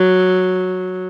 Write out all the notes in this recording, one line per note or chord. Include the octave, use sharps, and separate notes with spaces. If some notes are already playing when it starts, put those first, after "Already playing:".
Already playing: F#3